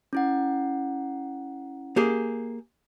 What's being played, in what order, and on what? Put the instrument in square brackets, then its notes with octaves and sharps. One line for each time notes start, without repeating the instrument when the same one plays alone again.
[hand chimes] C#4 E4 F#5
[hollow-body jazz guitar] A#3 G4 G#4